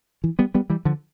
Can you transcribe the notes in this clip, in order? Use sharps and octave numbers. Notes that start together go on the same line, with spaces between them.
E3
G3 B3
G3 B3
E3 G3
D3 F3